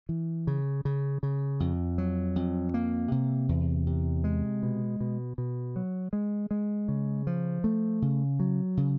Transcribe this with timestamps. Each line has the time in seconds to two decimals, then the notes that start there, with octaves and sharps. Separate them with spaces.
0.09 E3
0.47 C#3
0.85 C#3
1.23 C#3
1.60 F2
1.98 F#3
2.36 F2
2.74 A#3
3.12 C3
3.49 E2
3.87 C3
4.24 G#3
4.63 B2
5.00 B2
5.38 B2
5.76 F#3
6.13 G#3
6.51 G#3
6.88 C#3
7.27 F3
7.64 A3
8.02 C#3
8.40 F#3
8.77 C#3